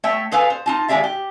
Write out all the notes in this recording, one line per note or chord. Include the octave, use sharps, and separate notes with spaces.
A3 C#5 E5 G5
G#4 A4 B4 F5 G#5
C5
D#4 F4 A5
D#3 G#3 G#4 D5 E5 F5
G4